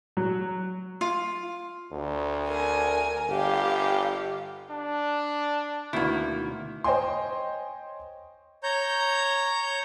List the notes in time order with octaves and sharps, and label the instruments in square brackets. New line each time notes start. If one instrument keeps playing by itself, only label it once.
[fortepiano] F#3
[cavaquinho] F4
[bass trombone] D2
[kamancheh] A#4 G#5
[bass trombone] G1 [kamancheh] G4 F5
[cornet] D4
[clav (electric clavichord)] D2 B2 E4 [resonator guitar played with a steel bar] D#3 A#3
[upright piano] C5 C#5 D#5 G5 G#5 C6
[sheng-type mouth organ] C#5 A#5 G6